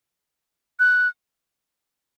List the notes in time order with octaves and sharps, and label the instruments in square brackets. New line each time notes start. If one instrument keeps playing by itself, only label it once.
[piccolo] F#6